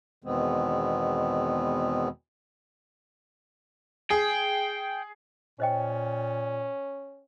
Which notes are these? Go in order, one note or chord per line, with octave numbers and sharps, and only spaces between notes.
E2 B2 D#3 G#3 B3 C4
G#4 G5
A#2 C#4 C5 D#5 G5